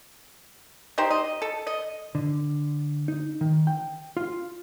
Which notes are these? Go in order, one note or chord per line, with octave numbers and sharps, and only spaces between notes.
D#4 G4 C5
D#5
A4
D#5
D3
D#4
D#3
G5
F4